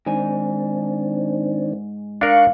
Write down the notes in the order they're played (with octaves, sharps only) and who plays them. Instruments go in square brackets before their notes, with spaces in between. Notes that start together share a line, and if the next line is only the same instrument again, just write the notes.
[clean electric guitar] G#2 G#5 [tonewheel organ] D#3 C4 D4
[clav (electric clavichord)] D4 A#4 [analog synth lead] F5 [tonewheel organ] C#6 F#6